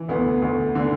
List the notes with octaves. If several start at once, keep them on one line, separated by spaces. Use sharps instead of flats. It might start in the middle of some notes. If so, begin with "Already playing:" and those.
Already playing: E3
D2 B3
D2
D3